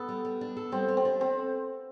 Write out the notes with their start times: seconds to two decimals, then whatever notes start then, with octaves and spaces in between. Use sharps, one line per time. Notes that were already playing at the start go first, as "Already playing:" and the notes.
Already playing: B3 A4
0.09 G3
0.25 G3
0.41 D4
0.57 A4
0.72 G3 C4
0.88 G3
0.97 C4
1.05 D4
1.21 C4 A4